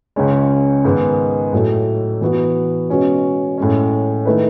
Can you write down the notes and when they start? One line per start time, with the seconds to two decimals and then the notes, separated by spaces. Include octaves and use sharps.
0.16 C#2 C#3 G#3 C#4
0.84 G#2 D#3 G#3 B3
1.53 A2 F#3 A3
2.21 E3 B3 F#4
2.89 B2 G#3 C#4 F#4 B4
3.58 A2 G#3 C#4
4.25 D#3 A3 E4 B4